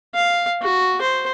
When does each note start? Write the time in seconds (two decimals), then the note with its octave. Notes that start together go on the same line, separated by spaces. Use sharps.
0.15 F5
0.62 F#4
1.02 C5